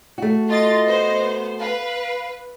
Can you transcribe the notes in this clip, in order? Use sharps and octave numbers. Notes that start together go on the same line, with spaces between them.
A3 F#4
F4 D#5 A6
B3 C5
B4 F5